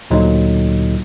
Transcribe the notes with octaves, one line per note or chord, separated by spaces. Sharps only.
D2 A#2 D3 F#3 D#4